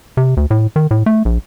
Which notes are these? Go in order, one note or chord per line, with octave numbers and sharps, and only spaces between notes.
C3
D2
A2
D#3
A2
A3
A#1